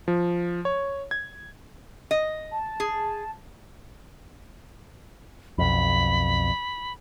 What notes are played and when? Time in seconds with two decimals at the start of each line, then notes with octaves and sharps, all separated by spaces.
0.08 F3
0.65 C#5
1.11 G#6
2.11 D#5
2.51 A5
2.80 G#4
5.58 B1 F2 B5